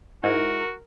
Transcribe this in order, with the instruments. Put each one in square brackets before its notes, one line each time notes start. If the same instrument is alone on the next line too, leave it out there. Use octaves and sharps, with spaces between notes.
[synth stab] G#2 [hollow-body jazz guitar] E4 [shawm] F#4 [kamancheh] A#4